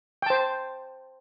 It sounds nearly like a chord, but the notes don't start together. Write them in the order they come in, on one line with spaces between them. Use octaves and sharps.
G5 A5 C5